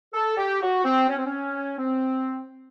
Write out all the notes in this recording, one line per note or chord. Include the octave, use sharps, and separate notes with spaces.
A4
G4
F#4
C4
C#4
C4
C#4
C4